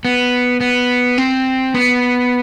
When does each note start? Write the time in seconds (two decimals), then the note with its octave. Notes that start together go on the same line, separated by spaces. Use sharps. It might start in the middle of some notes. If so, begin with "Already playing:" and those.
0.05 B3
0.61 B3
1.18 C4
1.74 B3